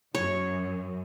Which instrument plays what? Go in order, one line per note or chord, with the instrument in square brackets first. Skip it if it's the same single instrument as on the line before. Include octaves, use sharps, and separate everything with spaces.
[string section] F#2 [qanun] C#5